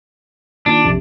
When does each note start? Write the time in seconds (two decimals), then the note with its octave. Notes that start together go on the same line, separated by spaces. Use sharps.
0.66 A#2 D#3 D4
0.85 A#1 F2 C3